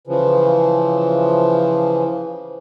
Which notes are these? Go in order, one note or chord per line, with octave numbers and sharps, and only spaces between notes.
C#3 E3 F3